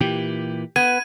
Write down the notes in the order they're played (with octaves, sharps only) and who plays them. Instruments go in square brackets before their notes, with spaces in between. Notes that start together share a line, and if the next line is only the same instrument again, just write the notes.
[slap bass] A#2 E3 [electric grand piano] G4
[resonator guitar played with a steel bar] B3 [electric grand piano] G#6 [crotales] D#7